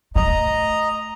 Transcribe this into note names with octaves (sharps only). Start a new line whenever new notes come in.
A3 D#5 A#5